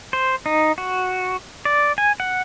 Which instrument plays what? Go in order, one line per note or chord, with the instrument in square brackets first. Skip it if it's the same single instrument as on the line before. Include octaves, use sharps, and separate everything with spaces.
[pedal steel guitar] C5
D#4
F#4
D5
G#5
F#5